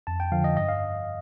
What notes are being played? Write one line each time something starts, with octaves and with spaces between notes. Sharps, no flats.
F2 A5
G5
D3 F3 F5
D#5
G2 D#5
F5